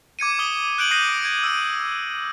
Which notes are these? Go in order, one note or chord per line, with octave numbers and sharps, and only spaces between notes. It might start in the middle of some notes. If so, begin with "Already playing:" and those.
D6 G#6 C#7 D#7
D6 D#6 G7
F#6 G6 D7 D#7 F#7
D#6 F#6 G6 A#6 C7 D#7
G#6 D7
E6 D#7